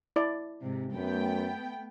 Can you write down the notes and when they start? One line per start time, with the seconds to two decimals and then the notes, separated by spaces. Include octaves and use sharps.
0.16 E4 D5
0.61 G#2 C3
0.93 F#2 A3 B3 G5